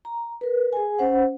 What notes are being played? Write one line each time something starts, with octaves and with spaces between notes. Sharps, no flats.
A#5
A#4 B4
G#4 G#5
C#4 C5 F#5